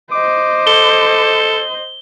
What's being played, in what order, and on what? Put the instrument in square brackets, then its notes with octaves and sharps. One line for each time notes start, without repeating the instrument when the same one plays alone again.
[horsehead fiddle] C5 D#5 [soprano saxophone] D6
[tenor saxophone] A4 [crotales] G7